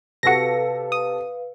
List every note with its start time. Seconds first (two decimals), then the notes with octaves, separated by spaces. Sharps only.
0.23 C3 F#4 A4 B4 F5 A#6 C#7
0.92 D#6